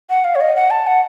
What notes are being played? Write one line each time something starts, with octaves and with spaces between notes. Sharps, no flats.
F#5
F5
C#5
D#5
F#5
A5
F#5